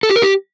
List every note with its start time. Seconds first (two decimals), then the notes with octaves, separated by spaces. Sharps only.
0.03 A4
0.09 G4
0.16 A#4
0.22 G4